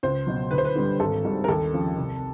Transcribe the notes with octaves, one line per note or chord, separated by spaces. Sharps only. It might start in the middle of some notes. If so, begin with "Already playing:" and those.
C#2 C5
B2 F#3
D2 B4
C5
B4
D3 G3
G#1 A4
G#2 D#3 G3
A#4
D#2 A4
C#3 F3
C2